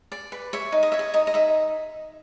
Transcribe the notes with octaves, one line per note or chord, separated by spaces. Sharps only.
D5
B4
C#5 E5
D#4
D#5
C#5 E5
D#5
D#4 D#5
D#5
D#4 E5